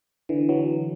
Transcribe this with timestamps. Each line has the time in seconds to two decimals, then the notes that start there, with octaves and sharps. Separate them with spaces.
0.29 D3 E3
0.49 E3 F#3